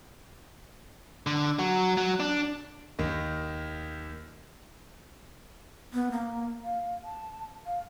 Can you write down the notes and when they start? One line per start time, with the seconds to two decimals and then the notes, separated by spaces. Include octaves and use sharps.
1.27 D3
1.59 F#3
1.97 F#3
2.20 D4
2.99 D#2 D#3
5.94 B3
6.11 A#3
6.64 F5
7.04 A5
7.66 F5